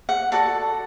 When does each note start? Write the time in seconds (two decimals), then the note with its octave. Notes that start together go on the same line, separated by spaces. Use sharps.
0.09 F#5
0.32 F#4 A4 D5 A5